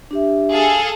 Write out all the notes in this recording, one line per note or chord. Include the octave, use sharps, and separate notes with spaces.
D4 G4 E5
G#4 A4 F5